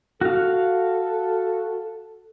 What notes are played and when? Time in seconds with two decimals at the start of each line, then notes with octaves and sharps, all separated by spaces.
0.21 F#4 A4 F5